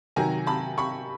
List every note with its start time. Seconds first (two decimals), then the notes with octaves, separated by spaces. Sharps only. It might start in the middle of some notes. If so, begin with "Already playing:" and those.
0.16 C3 D#3 F#3 G#5 A#5
0.47 A5 B5
0.78 B5 C#6